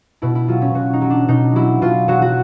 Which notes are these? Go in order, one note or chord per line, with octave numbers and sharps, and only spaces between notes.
B2 E4
E4
F#3 F4
C#4
B2 F#4
D#4
F#3
D4
B2 D#4
F#3 E4
B2 F4
F#3 F#4
F#4